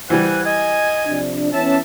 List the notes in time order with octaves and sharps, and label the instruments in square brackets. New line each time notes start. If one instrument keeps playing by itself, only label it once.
[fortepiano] E3 G3 [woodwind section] C5 F#5 G#5
[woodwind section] D#5 G#5
[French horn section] C3 F3 D4
[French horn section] E3 B3 C#4 [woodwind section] E5 A5